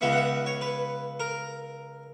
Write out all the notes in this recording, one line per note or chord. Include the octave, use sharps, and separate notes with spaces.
C#2 C#3 G#3 B3 E5
F#5
E5
C#5
B4
A#4